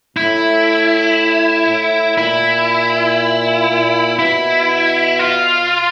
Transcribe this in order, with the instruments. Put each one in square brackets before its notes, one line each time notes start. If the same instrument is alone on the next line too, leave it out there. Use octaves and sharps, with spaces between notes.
[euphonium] A2 [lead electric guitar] E4
[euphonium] A2
[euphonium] A#2 [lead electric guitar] E4
[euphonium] A#2
[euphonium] B2 [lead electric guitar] E4
[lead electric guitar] F4